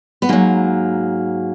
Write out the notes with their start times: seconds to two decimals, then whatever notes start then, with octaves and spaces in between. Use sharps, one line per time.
0.22 B3
0.29 G#2 F#3 A#3